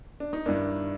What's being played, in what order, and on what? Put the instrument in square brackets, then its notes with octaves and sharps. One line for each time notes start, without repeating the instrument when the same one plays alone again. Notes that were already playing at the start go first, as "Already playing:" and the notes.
[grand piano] D4
D#4
G2 D#3 D4 E4